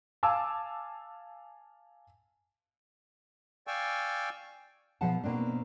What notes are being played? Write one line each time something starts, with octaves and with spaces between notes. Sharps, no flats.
F5 G#5 A5 D6 E6
D5 F5 G5 G#5 C#6 E6
B2 F3 G#4 F#5 A5
B2 A#3 C4 D4